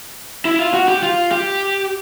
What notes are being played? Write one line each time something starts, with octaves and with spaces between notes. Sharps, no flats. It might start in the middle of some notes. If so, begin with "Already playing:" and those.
E4
F4
F#4
G4
F4
G4